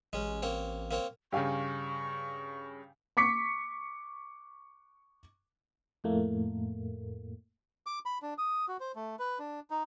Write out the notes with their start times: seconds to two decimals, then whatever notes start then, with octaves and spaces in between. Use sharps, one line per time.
0.13 A1 G#3 C#4
0.42 A#3 C4 C#5
0.91 A#3 C4 C#5
1.32 G2 C#3 G4 F5 G#5 C#6
3.17 C#6 D6 B6 C#7
6.04 F2 A2 A3 A#3
7.86 D6
8.06 B5
8.22 D4
8.38 D#6
8.68 F#4
8.80 C5
8.96 A3
9.19 B4
9.39 D4
9.70 D#4